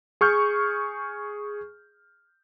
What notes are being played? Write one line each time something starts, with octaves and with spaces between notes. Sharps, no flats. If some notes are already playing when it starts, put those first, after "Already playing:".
G#4 C#6 F6 G6